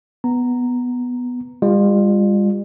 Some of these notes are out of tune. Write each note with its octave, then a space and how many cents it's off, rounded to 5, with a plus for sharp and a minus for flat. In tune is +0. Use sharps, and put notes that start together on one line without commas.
B3 +0 A#5 -5
G3 +45 F4 +5